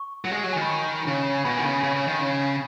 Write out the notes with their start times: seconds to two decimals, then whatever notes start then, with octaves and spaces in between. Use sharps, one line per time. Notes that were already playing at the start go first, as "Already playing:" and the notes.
Already playing: C#6
0.25 F#3
0.31 G#3
0.44 F#3
0.53 G#5
0.56 D#3
0.62 B5
0.70 C#6
1.07 C#3
1.34 G#5
1.45 B2 B5
1.57 D#3 G#5
1.64 C#3 B5
1.70 G#5
1.83 C#3 B5
1.96 C#3
2.08 D#3
2.21 C#3